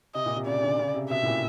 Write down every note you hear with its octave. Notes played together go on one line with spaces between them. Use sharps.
C3 D#5
A#2
C3
C#3 D5
C#3
D3
C#3
C3
B2 E5
A2
A#2